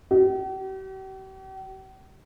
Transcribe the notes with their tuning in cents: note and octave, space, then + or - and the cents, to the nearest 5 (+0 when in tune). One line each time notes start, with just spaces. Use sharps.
G4 -45